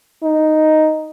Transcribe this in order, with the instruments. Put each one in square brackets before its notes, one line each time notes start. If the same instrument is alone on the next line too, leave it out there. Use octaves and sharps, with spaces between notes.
[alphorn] D#4